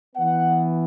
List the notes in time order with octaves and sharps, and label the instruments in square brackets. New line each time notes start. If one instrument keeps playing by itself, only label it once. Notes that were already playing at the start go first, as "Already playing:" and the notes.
[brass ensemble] E3 B3 F#5